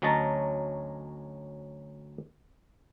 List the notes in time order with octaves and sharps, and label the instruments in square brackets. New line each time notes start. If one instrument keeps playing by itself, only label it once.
[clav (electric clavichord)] D2 F#3 C#4 D#5 A5 A#5